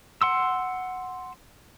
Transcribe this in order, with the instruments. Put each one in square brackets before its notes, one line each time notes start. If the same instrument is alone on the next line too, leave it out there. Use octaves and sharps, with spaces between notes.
[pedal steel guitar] F#5 C6 E6